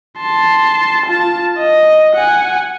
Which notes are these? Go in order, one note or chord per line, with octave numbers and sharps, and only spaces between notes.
A5 C6
F4 A5
D#5
F#5 G#5